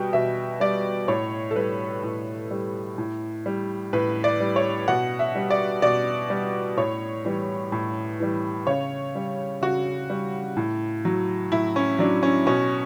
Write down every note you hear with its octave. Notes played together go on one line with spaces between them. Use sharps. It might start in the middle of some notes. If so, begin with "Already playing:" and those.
Already playing: B2 G3 G5
B2 E5
G3 D5
A2 C#5
A4
G3 B4
A2
G3
A2
G3
A2 B4
D5
G3
C#5
B2 F#5
E5
G3
D5
B2 D5
G3
A2 C#5
E3 G3
A2
E3 G3
C#3 C#5
G3
C#3 F#4
G3
A2
F#3
A2 E4
C#4
F#3 D4
C#4
B2 C#4